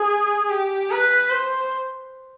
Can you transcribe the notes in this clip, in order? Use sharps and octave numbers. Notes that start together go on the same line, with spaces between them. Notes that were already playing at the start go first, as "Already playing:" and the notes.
Already playing: G#4
G4
B4
C5